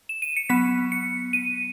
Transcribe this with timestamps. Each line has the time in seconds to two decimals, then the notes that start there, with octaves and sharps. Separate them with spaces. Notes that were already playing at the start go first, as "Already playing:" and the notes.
0.09 E7
0.22 D#7
0.36 C#7
0.49 F#3 B3 B6
0.92 C#7
1.33 D#7